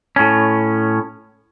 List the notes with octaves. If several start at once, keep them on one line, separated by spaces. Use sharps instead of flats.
A2 C#4